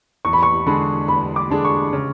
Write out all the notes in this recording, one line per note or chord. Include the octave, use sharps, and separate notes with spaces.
E2 C#6
B5
C#6
D3 G#3 D4 G#4 B5
E2 B5
D6
D3 G#3 D4 G#4
C#6
C#3